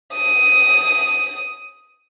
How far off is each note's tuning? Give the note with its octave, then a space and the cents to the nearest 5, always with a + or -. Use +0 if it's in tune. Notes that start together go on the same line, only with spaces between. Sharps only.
D#6 +10